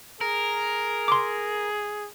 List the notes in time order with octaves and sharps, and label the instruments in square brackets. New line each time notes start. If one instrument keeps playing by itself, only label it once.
[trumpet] G#4 [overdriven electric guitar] A#4
[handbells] C6 D6